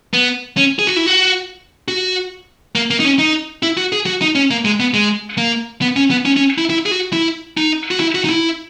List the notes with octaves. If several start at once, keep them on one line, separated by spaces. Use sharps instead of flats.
B3
C#4
G#4
F#4
E4
F#4
F#4
A#3
A#3
D#4
C#4
D#4
E4
F#4
G#4
F#4
D#4
C#4
A#3
G#3
B3
G#3
A#3
B3
C#4
B3
C#4
C#4
E4
E4
G#4
F#4
E4
D#4
F#4
E4
F#4
D#4
E4